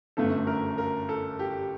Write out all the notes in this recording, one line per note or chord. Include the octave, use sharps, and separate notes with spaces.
G1 F#2 D3 A3 A4
A#4
A#4
A4
G4